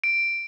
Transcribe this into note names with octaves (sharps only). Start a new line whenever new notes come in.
D7